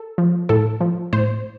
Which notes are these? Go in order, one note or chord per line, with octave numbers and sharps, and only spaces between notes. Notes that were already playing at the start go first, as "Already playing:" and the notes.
Already playing: A4
F3
A2 A4
F3
A2 C5